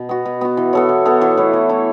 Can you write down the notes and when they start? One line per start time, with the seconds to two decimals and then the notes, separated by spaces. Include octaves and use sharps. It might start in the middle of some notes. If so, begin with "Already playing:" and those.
Already playing: B2
0.09 B3 F#4
0.25 B2
0.41 B3 F#4
0.57 E3
0.73 B3 A4 C#5
0.89 E3
1.05 B3 A4 C#5
1.21 E3
1.37 A3 E4 C#5
1.53 E3
1.69 A3 E4 C#5